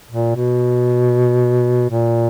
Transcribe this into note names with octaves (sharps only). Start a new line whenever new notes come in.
A#2
B2
A#2